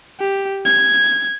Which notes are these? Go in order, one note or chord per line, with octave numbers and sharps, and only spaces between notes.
G4
G#6